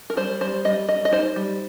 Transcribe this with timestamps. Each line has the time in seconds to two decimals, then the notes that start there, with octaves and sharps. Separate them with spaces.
0.10 A#4
0.17 G3 C5
0.41 G3 C5
0.65 G3 D#5
0.89 G3 D#5
1.05 D#5
1.12 D#4 C5
1.36 G3